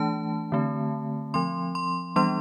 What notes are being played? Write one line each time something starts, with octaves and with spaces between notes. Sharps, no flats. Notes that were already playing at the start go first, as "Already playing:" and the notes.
Already playing: E3 A3 D4 A5
D3 A3 C4
F3 C4 C6
C6
E3 G3 B3 D4 C6